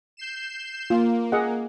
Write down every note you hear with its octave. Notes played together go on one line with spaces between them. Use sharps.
G6 C7 E7
A#3 F4
G#4 D#5 F#5